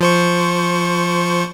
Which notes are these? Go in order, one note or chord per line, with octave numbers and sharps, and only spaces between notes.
F3 C5 C#6